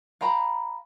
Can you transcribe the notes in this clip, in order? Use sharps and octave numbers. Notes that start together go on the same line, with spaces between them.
F5 G5 A#5 B5